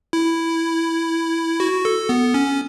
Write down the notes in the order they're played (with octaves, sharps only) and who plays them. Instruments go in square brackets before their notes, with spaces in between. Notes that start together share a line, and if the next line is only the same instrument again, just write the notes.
[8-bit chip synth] E4
F#4
A4
B3
C#4